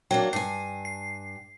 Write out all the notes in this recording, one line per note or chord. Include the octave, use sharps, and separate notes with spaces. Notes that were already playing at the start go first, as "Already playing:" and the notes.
F#3 A#3 D4 G5
G2 G#5 C7
C7